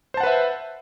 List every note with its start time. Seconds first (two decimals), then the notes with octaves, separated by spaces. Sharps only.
0.14 C5
0.17 A5
0.20 F#5
0.23 B4
0.27 E5